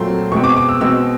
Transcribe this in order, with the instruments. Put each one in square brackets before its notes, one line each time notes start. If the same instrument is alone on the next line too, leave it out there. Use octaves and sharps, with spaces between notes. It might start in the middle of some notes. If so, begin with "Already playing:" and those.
Already playing: [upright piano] A#2 F#3 A3 C4 C6
B2 G#3 C4 C#6
D6
D6
E6
B2 G#3 C4 E6